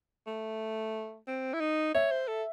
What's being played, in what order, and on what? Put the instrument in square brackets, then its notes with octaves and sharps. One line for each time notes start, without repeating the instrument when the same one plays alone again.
[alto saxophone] A3
C4
E4
D#4
[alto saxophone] C#5 [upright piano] E5
[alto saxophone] C5
A4